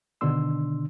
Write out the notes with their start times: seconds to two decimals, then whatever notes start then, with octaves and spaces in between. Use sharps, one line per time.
0.21 B2 D3 D#3 D4 C6 E6